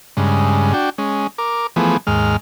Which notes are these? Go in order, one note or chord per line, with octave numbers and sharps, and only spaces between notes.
G2 C#3 G#3
D4 F#4 G5
G#3 C#4
A#4 D6
E3 F3 A3 B3 G#4
D#2 G#2 G#3 F6